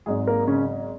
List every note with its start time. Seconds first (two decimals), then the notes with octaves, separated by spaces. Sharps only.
0.06 G#1 G#2 F#3 G#3 G#4
0.27 A#3 A#4
0.47 C#3 C#4